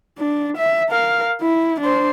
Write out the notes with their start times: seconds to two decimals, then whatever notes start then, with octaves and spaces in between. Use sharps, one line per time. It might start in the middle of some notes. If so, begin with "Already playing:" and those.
0.18 D4
0.57 E5
0.89 A#4 F5
1.42 E4
1.80 D4 C5